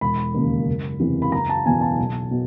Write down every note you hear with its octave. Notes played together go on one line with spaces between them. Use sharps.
E1 B5
D#2 C#3
F#1
E2 C3 E3
B5
F#1 A#5
A5
E2 B2 G#5
A5
B1
B2